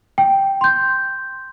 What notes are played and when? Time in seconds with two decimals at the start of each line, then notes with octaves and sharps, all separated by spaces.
0.18 G5
0.61 C6 G6